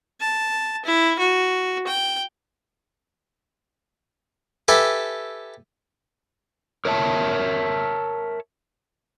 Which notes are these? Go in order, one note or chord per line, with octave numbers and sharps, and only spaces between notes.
A5
E4
F#4
G5
G4 A4 B4 E5 G#5
A#4 C#5 E5 A5